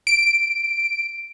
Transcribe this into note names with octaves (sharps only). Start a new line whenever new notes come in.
D7